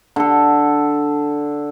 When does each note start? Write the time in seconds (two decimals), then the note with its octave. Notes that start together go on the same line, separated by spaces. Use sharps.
0.16 D3 A4